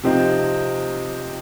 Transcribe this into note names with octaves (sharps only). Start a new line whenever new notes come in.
C3 F3 C4 D#4